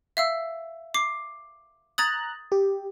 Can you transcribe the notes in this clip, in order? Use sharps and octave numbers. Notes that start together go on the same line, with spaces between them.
E5 F5 E6
D6 C7
A#5 D#6 F#6 G#6 A6
G4